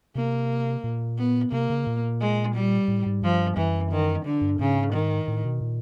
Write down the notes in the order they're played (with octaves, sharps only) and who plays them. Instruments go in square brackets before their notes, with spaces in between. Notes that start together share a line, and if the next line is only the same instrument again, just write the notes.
[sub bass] C3 [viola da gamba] A#3
[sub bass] A#2
[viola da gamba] B3
[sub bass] C3 [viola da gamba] A#3
[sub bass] C#3
A#2
[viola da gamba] G#3
G3
[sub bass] A2
G#2
[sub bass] G2 [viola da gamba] F3
[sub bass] F#2 [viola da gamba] E3
[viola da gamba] D#3
D3
[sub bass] G2
[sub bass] G#2 [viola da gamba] C#3
[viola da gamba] D#3
[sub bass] A2
B2
A#2